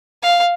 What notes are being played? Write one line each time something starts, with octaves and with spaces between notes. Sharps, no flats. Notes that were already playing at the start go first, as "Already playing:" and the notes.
F5